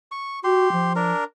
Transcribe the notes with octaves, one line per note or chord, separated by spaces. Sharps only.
C#6
F#4 G4 C6
F3
D4 A#4